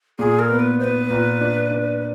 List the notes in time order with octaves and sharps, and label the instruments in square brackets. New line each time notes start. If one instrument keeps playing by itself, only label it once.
[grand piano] A#2 [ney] G#4
[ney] A#4
[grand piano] B3
[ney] B4
[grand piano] B3 [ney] C5
[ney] B4
[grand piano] A#2
D4
D4